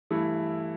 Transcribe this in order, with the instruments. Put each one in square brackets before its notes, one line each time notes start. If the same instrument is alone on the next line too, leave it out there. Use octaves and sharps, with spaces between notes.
[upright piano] G2 E3 A3 E4